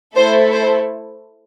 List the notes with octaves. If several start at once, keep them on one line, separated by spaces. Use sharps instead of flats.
A3 E4 A4 C5
C5